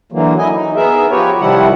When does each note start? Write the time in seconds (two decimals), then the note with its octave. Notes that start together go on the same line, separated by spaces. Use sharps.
0.12 D3 E3 F#3 A#3
0.39 E4 D#5 G#5
0.53 D#4
0.76 B3 G#4 A#4 E5
1.11 F3 F#4 G4 B4 C#5
1.40 C3 D#3 F3 G3 E4 F#5